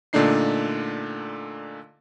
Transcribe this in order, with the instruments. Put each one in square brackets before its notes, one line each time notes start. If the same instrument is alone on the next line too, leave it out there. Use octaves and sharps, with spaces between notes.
[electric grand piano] A#2 D3 A3 D4 D#4 C7